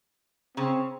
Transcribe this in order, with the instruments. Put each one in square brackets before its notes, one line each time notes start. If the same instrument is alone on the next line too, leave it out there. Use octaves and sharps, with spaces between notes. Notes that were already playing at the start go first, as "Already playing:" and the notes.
[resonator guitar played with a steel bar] C#3 [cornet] C4